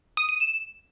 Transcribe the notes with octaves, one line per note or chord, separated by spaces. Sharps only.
D#6
D#7
E7